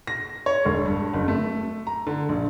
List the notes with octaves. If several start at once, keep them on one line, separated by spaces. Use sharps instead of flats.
A#6
C#5
E1
G2
F#1
A3
A#5
D3
A#1